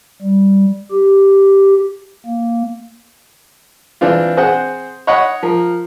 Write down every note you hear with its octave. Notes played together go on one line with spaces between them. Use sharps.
G3
G4
A#3
E3 C4 D4 F4
C4 G#4 C5 F#5
C#5 D#5 F#5 B5
F3 A#4